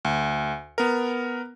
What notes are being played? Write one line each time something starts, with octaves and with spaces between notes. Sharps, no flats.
D2
B3 A#4